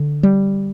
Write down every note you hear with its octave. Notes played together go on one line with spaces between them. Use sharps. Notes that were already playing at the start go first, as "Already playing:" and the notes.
Already playing: D3
G3